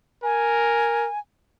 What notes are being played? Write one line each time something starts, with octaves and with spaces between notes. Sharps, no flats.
A#4 G#5